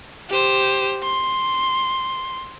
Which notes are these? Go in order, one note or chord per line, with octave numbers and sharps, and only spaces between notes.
G4 C5
C6